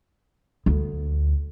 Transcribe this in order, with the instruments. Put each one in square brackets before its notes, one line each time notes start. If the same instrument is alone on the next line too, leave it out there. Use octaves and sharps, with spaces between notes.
[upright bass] D2